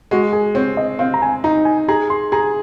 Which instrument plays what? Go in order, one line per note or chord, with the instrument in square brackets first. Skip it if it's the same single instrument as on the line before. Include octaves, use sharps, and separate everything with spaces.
[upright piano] G#3 [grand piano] F#4
[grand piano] G#4
[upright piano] C4 [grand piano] C#5
[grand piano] D#5
[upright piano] C4 [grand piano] F5
[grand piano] A#5
G#5
[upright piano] D#4 [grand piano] A#5
[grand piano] G#5
[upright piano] G#4 [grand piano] A#5
[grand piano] C6
[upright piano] G#4 [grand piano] A#5